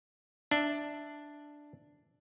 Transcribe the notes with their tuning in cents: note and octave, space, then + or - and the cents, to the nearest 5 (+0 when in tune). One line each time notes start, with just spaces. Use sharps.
D4 +0 E5 +0